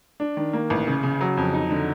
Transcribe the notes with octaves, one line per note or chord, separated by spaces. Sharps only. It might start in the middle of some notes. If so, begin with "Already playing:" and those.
D4
D#3
A#3
A1
C#3
C#3
F#3
F2
D#4
D3